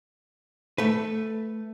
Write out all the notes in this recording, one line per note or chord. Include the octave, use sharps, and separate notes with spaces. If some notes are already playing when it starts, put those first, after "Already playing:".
A3 B4